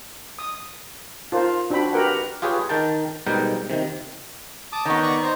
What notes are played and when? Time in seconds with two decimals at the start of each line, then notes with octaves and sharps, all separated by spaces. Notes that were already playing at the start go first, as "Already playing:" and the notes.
0.39 D#6
1.32 F4 A#4 C5
1.70 D4 F#4 C5 G5 B5
1.93 F#4 G4 A#4 B4 F#5 G5
2.42 F4 G4 G#4 B4 C#5
2.69 D#3 A#4 G5 A5
3.26 G#2 B2 G3 A#4 G5
3.70 C3 D#3
4.73 A5 D6 D#6
4.85 D#3 B3 C#5 G5
5.03 D5 A#5 C#6
5.22 D#4 C5 A#5